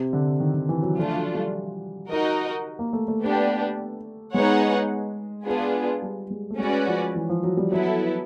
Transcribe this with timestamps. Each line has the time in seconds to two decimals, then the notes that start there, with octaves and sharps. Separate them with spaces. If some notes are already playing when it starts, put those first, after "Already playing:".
Already playing: C3
0.13 D3
0.40 D#3
0.54 D#3
0.69 E3
0.83 F#3
0.97 F3 A3 D4 F4
1.15 F#3
1.34 G3
2.09 D#4 F#4 A#4 D#5
2.79 A#3
2.93 A3
3.08 A3
3.22 B3 D4 G4
4.33 G#3 B3 D#4 G#4 C#5 F#5
5.47 B3 D4 F4 G#4
6.02 G3
6.30 G#3
6.51 A3
6.59 G#3 C#4 F#4 B4 D5
6.87 F3
7.16 E3
7.29 F3
7.43 F#3
7.57 G3
7.72 F#3 B3 E4 A4